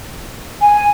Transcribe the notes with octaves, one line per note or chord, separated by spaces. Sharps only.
G#5